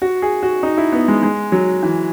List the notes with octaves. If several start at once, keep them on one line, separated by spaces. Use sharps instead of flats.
F#4
G#4
F#4
D#4
E4
B3
G#3
G#3
F#3
E3